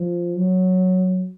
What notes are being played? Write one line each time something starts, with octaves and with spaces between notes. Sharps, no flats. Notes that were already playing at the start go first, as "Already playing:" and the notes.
Already playing: F3
F#3